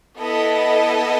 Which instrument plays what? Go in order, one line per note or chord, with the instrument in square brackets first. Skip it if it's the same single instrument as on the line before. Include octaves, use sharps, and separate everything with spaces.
[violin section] B3 E4 A4 D#5